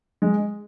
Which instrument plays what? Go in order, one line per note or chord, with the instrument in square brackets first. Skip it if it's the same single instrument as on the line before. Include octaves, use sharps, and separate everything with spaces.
[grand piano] G#3